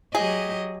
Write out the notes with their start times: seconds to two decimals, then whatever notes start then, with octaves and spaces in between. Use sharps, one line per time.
0.15 F#3 G4 G#4 D#5